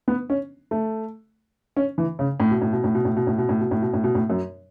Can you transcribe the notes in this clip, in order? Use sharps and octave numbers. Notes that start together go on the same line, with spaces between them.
B3
C#4
A3
C#4
E3
C#3
A2
B2
A2
B2
A2
B2
A2
B2
A2
B2
A2
B2
A2
B2
A2
B2
A2
F#2